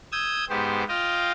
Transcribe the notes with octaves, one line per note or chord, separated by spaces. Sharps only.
D#6 E6 G6 G#6
G#2 B3 G4 C5
F4 D#5 F5 G5